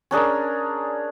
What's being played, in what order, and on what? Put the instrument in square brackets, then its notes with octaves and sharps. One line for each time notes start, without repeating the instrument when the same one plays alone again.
[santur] C#4 D4 G#4 A#4